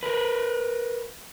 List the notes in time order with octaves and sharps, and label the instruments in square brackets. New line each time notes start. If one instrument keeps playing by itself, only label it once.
[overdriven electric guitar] A#4 B4